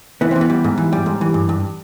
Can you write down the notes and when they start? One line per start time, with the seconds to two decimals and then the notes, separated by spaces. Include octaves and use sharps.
0.21 E3 B3
0.31 C4
0.36 E3
0.41 B3
0.50 G3
0.64 G#2
0.78 E3
0.93 G3
1.06 G#2
1.21 E3
1.34 G2
1.49 G2